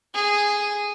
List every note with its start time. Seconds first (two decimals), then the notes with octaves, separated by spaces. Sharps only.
0.14 G#4